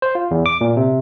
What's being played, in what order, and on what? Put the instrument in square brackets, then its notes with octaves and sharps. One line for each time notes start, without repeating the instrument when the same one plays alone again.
[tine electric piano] C5
F4
E2
D6
A#2
C3